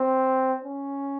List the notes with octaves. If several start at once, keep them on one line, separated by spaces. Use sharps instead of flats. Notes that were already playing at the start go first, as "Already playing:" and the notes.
Already playing: C4
C#4